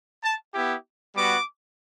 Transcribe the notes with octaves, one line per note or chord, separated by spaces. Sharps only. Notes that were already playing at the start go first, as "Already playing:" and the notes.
A5
B3 E4 G4
G3 B3 F#4 D6